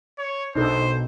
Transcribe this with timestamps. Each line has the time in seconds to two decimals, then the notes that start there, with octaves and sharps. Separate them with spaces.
0.18 C#5
0.55 B1 D4 D#4 A4 C5